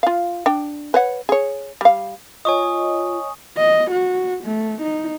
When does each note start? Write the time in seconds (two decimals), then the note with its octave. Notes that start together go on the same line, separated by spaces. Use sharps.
0.03 F4 F5
0.46 D4 G5
0.94 B4 C#5 F#5
1.29 G#4 C#5
1.81 G3 F5
2.45 F4 C#5 D#5 G#5 C#6 D#6
3.57 D#5
3.91 F#4
4.44 A3
4.82 D#4